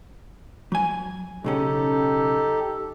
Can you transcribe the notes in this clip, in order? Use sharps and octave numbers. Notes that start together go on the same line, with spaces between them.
F#3 G#5
B1 C#3 C#4 D#4 G4 A4